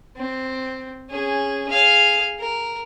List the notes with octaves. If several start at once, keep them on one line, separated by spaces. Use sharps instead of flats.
C4
C#4 G#4
G#4 F5
A#4